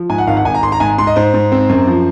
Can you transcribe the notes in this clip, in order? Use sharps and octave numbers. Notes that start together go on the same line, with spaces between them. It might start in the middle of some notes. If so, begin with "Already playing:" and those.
Already playing: F3
G#2 G#5
F#5
G#1 F5
F#5
G#1 G#5
A#5
G#1 C6
A#5
G#2 G#5
G#2 C6
D#5
G#2 C5
G#2
C4
F#2
F3